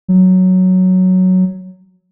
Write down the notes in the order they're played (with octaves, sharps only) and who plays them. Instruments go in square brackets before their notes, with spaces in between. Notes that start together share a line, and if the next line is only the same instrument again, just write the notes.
[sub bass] F#3